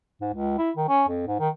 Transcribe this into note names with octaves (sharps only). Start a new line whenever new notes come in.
G#2
C#2
E4
D#3
C#4
F2
G#2
D#3